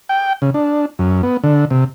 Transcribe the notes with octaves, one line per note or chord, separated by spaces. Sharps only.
G5
C#3
D4
F#2
B3
D3
C3